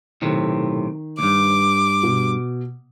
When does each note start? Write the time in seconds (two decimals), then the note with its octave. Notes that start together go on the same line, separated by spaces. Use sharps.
0.22 B1 A2 C3 D#3
1.19 D2 G2 D6
2.03 B2